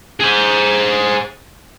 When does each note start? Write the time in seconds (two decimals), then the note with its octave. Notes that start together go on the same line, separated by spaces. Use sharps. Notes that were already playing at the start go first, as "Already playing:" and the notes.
0.20 G#4 C5